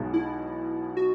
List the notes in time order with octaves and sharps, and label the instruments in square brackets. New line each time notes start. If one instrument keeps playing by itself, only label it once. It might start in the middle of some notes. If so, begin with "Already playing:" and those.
Already playing: [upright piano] B1 B2 G#3 D#4
[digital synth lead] E4
F#4